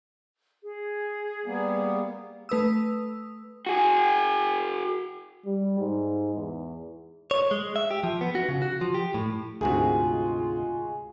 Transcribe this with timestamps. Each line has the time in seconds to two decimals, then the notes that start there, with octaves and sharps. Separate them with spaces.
0.63 G#4
1.46 G3 A#3 B3
2.49 A3 B4 D#6 E6
3.66 F#4 G#4
5.46 G3
5.80 G#2
6.35 E2
7.31 C#5
7.51 G#3
7.76 E5
7.91 G4
8.04 F3
8.21 B3
8.35 F#4
8.49 C#3
8.62 F#4
8.81 F3
8.94 G4
9.14 A2
9.61 D2 G#2 C3 G#3 F4 F#4 G#4